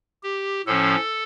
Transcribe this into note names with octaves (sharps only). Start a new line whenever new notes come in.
G4
A2 F3 C#4 A4